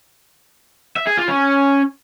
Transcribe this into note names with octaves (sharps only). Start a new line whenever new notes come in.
E5
G#4
F4
C#4